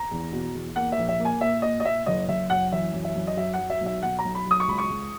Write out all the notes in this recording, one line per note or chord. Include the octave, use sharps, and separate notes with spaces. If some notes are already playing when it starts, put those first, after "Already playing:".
Already playing: A#5
E2
B2
E2
A#3 F#5
E5
A#1
E5
A#3
G#5
A#2 E5
A#2 D#5
D#5
A#2 E5
F#1 D#5
F#1 E5
F#2 F#5
E3 E5
F#2
E5
F#2
D#5
F#3 E5
F#3 F#5
E5
B1 E5
B1 F#5
A#5
B1
B5
F#3 D#6
C#6
C#2 B5
C#6
C#2